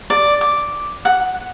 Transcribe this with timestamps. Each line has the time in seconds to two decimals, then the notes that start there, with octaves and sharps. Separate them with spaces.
0.10 D5
0.41 D6
1.05 F#5